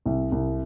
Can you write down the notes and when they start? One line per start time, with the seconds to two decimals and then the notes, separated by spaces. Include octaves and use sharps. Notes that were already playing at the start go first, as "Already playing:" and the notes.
0.06 C2
0.32 C2